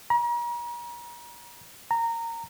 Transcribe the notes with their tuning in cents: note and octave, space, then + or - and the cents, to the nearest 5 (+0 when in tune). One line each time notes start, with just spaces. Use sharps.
A#5 +40
A#5 -15